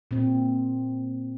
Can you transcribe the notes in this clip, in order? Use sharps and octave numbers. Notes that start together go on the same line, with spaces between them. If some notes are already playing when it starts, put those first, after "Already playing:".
A#2 C4